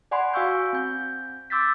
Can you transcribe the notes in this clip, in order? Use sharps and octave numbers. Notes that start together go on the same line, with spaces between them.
D5 F#5 G#5 B5 C6
F#4 F5 G#5 C#6 E6 G6
C4 G6
C6 D6 E6 G6 A6 B6